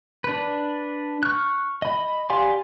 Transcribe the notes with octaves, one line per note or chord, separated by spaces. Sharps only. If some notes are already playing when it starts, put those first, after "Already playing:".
D4 B4
C#6 F6 F#6
D#5 B5
G4 D5 F5 G#5 C6